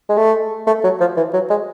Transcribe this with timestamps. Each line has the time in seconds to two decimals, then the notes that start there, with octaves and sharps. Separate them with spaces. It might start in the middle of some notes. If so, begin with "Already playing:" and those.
0.09 G#3
0.17 A3
0.67 A3
0.84 F#3
1.00 F3
1.17 E3
1.34 F#3
1.50 G#3